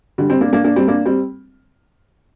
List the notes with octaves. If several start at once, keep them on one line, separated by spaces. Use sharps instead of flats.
D3 G3
G3 C4
A#3 D4
A#3 D4
A#3 D4
G3 C4
A#3 D4
G3 C4